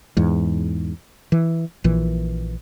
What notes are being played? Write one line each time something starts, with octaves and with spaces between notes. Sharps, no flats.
E2 G#2
E3
A#1 A#2 E3